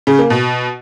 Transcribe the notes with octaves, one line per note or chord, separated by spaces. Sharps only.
C#3
A#3
B2